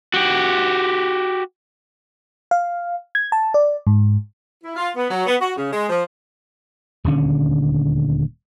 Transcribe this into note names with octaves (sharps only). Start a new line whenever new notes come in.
F#4 G4
F5
G#6
A5
D5
G#2
E4
F4
B3
F#3
B3
F#4
C#3
G#3
F3
D#1 D2 D3 C#4